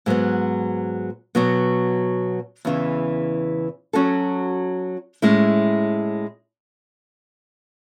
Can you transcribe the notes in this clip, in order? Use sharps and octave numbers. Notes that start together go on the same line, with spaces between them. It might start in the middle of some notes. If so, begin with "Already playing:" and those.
G#2 F#3 B3
B2 F#3 B3
E2 C#3 E3
F#3 C#4 F#4 A4
A2 G#3 C#4 E4